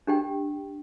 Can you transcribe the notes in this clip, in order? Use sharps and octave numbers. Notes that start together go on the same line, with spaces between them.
D4 G4 G5